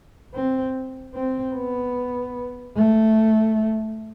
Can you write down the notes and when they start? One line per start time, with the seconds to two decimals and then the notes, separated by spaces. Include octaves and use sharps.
0.34 C4
1.14 C4
1.55 B3
2.76 A3